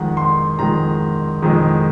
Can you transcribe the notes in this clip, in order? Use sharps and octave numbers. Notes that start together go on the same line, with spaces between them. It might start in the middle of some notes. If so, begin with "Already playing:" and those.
Already playing: F2 D#3 G#3 F#5
C6
F2 D#3 G#3 A#5
F2 D#3 G#3